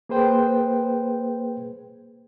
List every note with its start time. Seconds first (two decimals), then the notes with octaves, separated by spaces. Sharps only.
0.09 A#3 G#4 B4 C5 G5